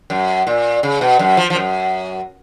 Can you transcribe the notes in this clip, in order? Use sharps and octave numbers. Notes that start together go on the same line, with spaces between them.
F#2
A#2
C#3
B2
F#2
F3
F3
F#2